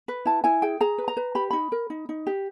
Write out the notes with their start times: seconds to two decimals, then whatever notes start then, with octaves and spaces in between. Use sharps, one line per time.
0.08 B4
0.25 E4 A5
0.44 E4 G#5
0.62 G#4 G5
0.81 G#4 A#5
0.98 B4
1.08 A#5
1.17 B4
1.35 G4 B5
1.51 D#4 B5
1.72 A#4
1.90 D#4
2.09 D#4
2.27 G4